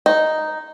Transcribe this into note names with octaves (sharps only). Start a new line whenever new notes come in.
D#4